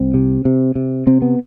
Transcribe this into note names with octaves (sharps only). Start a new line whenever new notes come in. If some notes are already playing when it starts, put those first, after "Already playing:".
Already playing: C2 C4
C3
C3
C3
C3 C4
B3